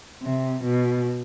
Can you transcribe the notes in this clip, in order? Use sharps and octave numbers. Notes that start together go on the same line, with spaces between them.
C3
B2